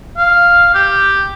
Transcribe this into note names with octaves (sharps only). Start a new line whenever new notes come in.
F5
G4